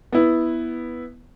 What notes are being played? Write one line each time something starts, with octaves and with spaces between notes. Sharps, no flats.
B3 E4